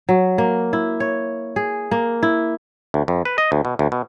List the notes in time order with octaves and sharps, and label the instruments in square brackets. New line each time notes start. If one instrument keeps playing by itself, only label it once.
[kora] F#3
A#3
E4
C#5
G#4
A#3
E4
[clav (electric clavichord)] D2
F2
B4
D#5
D2
B2
D2
B2